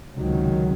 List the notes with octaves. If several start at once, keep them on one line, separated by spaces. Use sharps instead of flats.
C#2 C3 D#3 F#3